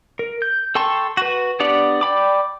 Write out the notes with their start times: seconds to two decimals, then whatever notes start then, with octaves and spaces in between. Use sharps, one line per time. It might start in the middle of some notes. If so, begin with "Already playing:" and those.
0.19 A#4
0.42 G6
0.75 A4 G5 A5 C6 C#6
1.17 F#4 B4
1.60 B3 D4 G4 D5 F#5
2.01 D5 G5 B5 D6